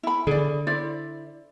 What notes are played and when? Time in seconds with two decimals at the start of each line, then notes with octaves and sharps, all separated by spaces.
0.03 E4 B5
0.27 D3 G#4 D5
0.67 E4 C5 D5